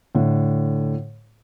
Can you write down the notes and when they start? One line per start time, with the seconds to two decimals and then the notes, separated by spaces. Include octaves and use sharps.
0.15 A2 D3